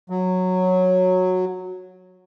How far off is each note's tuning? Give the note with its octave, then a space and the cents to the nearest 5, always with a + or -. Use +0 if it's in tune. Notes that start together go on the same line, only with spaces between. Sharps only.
F#3 -10